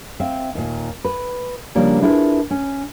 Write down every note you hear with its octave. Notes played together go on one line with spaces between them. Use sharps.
C4 E5 F5
D#2 A#2
B4
C#3 F3 G3 A#3 D4
D4 E4 F4 G#4 A#4 B4
C#4